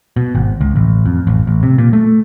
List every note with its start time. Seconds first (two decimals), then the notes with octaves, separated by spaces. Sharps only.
0.17 B2
0.35 G#1
0.61 C#2
0.76 A1
1.06 F2
1.27 A1
1.47 A1
1.63 C3
1.78 A#2
1.93 A3